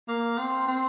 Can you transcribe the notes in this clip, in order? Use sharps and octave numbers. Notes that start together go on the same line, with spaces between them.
A#3
C4
C4